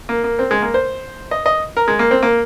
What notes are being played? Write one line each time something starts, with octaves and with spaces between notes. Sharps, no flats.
A#3
A#3
C4
G#3
A#3
C5
D#5
D#5
A#4
G#3
A#3
C4
A#3